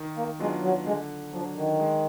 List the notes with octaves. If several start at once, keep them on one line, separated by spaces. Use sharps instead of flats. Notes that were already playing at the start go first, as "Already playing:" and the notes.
Already playing: D#3
A#3
F#3 G#3 B3 D4 F4
F#3
D3 G#3
F3 F#3 D4
D#3
G#3